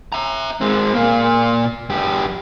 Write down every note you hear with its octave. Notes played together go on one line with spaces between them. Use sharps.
E5 A#5
G#3 C4
A#2 A#3
F#2 G4